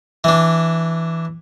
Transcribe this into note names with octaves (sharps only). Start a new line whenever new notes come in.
E3 D4